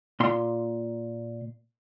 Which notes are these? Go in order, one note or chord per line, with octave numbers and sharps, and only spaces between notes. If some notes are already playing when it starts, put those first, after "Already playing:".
A#2 C6